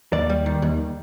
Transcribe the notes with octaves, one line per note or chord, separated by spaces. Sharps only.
D#2 D5
G3
D#3
D#2